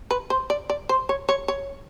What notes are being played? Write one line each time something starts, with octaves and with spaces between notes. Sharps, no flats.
B4
C5
D5
D5
C5
C#5
C#5
C#5